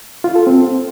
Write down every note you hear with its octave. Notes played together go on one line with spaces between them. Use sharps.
F4
A4
C4